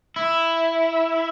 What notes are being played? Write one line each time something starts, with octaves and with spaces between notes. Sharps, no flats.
E4